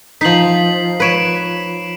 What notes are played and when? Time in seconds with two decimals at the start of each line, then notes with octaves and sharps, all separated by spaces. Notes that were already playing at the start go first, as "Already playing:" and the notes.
0.21 F3 D#4 B6 C7 F#7
1.00 B4 C#5 B6 D7 E7